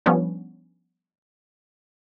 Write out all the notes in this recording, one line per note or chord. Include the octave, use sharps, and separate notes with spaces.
F3 G3 B3 C#4 D4